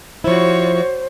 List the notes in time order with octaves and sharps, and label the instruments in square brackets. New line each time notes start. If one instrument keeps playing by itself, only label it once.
[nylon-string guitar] F3 E4 [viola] F#4 C#5 [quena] C5